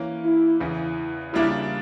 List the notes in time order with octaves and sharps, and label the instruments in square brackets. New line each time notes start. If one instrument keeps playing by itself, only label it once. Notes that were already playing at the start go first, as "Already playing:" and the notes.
Already playing: [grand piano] E3 A#3 C#4
[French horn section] E4
[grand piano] E2 C#3 E3
[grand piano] C#3 G3 A#3 D4 F4 [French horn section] E4